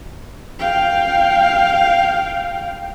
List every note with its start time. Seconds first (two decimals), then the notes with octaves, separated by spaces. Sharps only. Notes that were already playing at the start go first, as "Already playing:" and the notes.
0.59 F5 G5